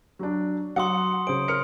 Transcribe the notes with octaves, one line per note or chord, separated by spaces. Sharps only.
F#3 D4
F#3 F#5 C6 D#6 C#7
C#3 C5 D#6 D7
A#4 F6 C#7